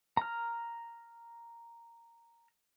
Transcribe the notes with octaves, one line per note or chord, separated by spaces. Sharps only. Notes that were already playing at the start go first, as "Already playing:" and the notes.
A#5 F6